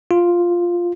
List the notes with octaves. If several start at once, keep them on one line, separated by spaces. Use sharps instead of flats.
F4